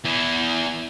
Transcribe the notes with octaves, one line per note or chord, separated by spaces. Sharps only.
E2 E3